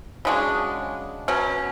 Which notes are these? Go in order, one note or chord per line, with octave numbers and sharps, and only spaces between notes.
C#3 G#3 D4 F#4
B2 F#3 C#4